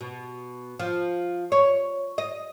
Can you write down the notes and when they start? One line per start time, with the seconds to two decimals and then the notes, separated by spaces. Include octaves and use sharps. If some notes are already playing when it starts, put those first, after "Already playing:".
0.01 B2
0.79 F3
1.52 C#5
2.18 D#5